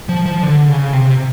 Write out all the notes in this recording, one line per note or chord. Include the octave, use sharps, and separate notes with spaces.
F3
F3
D3
C#3
C3